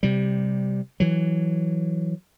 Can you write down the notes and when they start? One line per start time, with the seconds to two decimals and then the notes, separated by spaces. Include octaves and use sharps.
0.03 C3 G3
1.00 E3 F#3